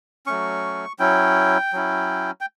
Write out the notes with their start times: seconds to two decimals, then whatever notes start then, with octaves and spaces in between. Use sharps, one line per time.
0.26 F#3 A3 C#4 C#6
0.99 F#3 C#4 E4 G5
1.73 F#3 C#4 E4
2.41 G5